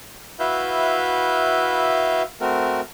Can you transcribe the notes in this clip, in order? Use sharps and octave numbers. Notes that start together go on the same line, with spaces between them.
E4 F#4 B4 E5 F5 G6
A3 C4 F#4 A#4